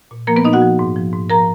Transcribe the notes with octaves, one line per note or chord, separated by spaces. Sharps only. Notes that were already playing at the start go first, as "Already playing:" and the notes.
A#2
F3 A#3 A#4
B3 B4
A#2 D#4 D#5
F#4 F#5
F3
G#2
F3
G#2
F3 A#4 A#5